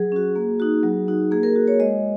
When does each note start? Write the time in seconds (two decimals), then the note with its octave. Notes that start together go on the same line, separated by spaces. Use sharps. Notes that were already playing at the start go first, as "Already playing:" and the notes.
Already playing: F#3 G#4
0.12 C#4 F#4
0.36 A#3
0.60 D#4 F#4
0.83 F#3
1.08 D#4 F#4
1.31 A#3 G#4
1.43 A#4
1.56 F#4
1.68 C#5
1.80 G#3 D#5